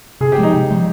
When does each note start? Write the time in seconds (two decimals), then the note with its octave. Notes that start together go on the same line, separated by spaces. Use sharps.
0.21 C3 G#4
0.32 G4
0.38 F3 G#3
0.43 D#4
0.54 C3
0.70 F3 G#3